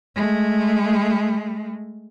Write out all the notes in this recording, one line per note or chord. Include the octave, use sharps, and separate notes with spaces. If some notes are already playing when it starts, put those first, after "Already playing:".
G#3 A3